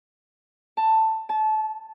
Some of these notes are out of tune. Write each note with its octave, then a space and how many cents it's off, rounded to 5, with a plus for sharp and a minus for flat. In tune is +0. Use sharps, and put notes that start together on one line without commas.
A5 +10
A5 -25